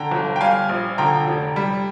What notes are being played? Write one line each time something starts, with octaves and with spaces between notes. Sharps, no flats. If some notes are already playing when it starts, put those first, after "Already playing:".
Already playing: D3 G5 A#5
G1
G5
G3 F5 G#5
A#1
D3 G5 A#5
F1
G3